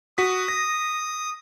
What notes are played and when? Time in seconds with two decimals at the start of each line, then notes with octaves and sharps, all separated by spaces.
0.18 F#4 D#6 B6
0.48 A#6